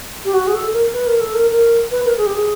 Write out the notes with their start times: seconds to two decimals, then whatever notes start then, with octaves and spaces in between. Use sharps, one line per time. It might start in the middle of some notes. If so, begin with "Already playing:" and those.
0.25 G4
0.33 F#4
0.47 G#4
0.54 A4
0.73 A#4
0.93 B4
1.06 A#4
1.20 A4
1.34 A#4
1.52 A#4
1.91 B4
2.05 A#4
2.18 G#4
2.26 G4
2.34 G#4